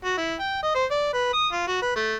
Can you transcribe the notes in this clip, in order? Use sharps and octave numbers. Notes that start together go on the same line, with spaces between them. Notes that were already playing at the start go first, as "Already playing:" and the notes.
F#4
E4
G5
D#5
C5
D5
B4
D#6
F4
F#4
B4
A3